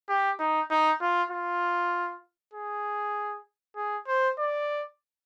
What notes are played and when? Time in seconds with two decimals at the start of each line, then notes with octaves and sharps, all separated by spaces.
0.09 G4
0.39 D#4
0.71 D#4
1.01 F4
1.31 F4
2.54 G#4
3.76 G#4
4.07 C5
4.39 D5